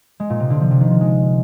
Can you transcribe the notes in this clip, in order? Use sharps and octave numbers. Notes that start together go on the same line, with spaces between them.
G#3
A#2
C3
D3
F3
C3
D#3
F3
G#3